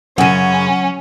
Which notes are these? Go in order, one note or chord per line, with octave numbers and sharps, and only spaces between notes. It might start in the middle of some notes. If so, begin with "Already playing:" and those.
F#2 C#3 F#3 C#4 F#5 D#7